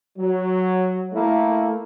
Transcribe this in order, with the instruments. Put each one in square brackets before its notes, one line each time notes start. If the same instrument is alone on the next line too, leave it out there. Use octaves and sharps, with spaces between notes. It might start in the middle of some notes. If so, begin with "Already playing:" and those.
[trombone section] F#3
A3 A#3 E4